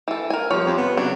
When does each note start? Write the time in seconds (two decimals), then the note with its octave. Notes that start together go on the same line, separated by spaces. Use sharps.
0.08 E3 A4
0.30 A#4 G#5
0.51 F3 G3 C#5
0.66 F2
0.78 C3 B3
0.97 C#3 F#3 D4